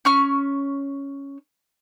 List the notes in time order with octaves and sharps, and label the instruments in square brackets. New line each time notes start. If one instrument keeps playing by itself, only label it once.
[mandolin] C#4 C#6 F6